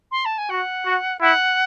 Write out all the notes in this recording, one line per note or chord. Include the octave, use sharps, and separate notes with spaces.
C6
A5
G#5
F#4 F#5
F#4
E4 F#5